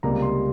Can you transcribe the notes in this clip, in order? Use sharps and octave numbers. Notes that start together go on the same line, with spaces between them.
C#2 C3 G3 A#3 A#5
C6